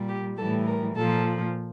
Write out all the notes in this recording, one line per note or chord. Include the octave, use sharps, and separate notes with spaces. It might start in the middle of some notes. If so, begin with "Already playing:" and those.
Already playing: A#2 G3
G4
A2 E3 G3 A4
A#4
A#2 F3 A4